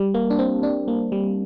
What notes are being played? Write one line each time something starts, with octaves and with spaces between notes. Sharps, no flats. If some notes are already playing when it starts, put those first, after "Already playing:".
Already playing: G3
A#3
D4
C4
D4
A#3
G3